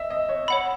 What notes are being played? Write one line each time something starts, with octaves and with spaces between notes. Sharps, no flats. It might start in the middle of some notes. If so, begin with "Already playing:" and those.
Already playing: D#5 E5
D#5
C#5
C#5 F#5 B5